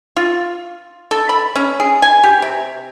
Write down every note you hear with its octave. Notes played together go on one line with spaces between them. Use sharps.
F4
A4
B5
C#4
G#4
G#5
G4
C3